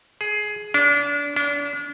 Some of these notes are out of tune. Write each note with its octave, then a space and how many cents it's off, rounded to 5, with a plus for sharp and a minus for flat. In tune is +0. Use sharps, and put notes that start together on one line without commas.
G#4 +15
D4 -30
D4 -35